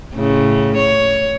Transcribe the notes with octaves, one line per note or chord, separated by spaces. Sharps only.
A2 C#3
C#5